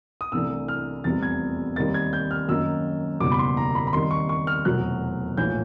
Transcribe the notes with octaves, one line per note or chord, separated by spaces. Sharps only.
D#6
C2 C3 E3 A3 D4 E6
F6
F1 E2 C3 E3 G3 A6
G#6
D#2 D#3 G3 C4 D#4 A6
G#6
G6
F6
F#2 D#3 F#3 A#3 D#4 E6
F#1 E2 B2 G3 D6
B5
C6
A#5
B5
B5
D#2 D#3 G3 C4 D#4 C6
C#6
C#6
F6
F1 E2 B2 F#3 F#6
A#1 A2 E3 G6